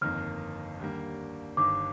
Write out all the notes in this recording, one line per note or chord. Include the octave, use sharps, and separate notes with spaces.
G1 F2 D#3 A#3 F6
D#2 D3 G3 A#3
G1 G2 D#3 D6